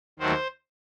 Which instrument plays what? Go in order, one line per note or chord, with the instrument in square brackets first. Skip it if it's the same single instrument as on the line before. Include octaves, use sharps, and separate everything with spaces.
[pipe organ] D#2 D#3 F#3 A3 C5